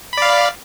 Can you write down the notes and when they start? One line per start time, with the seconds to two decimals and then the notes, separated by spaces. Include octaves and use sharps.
0.13 B5
0.18 D5
0.22 F5